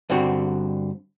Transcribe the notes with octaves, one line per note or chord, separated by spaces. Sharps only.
G2 D3 C4 F#4